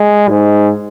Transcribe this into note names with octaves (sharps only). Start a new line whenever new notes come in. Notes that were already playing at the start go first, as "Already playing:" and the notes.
Already playing: G#3
G#2